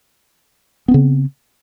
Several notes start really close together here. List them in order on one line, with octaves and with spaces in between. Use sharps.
B3 C4 C#3